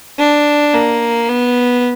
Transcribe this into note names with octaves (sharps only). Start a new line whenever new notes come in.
D4
A#3
B3